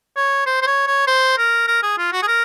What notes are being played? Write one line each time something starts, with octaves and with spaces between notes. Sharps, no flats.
C#5
C5
C5
C#5
C#5
C5
A#4
A#4
G#4
F4
F#4
G#4
A#4